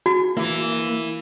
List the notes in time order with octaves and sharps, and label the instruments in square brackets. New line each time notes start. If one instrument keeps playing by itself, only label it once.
[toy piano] F#4
[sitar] E3 E4 [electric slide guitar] A#3